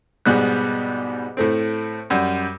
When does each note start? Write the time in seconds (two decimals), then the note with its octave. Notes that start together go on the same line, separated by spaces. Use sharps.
0.26 G#2 B2 G3 B3 F#6
1.37 A2 A3 C4
2.10 F#2 G3